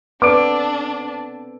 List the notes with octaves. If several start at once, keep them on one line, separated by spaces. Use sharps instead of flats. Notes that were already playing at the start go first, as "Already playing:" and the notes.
B3 C4 D4 A4 B4 D5 D6 D7